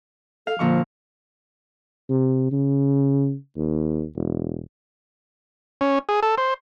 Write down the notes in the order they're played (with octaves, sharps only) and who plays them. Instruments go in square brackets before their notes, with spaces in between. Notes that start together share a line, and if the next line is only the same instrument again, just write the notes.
[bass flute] A4 [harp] F5
[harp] A#2 D3 C#6 [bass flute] F3
[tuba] C3
C#3
D#2
E1
[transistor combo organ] C#4
G#4
A4
C5